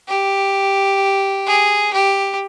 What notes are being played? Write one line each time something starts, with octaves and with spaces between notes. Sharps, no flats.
G4
G#4
G4